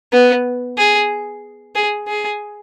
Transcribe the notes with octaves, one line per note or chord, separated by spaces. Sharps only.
B3
G#4
G#4
G#4